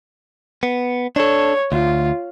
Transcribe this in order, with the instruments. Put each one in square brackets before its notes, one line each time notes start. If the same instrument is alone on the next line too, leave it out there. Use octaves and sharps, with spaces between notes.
[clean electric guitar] B3
[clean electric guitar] D4 A4 [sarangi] C#5
[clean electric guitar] D2 [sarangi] F4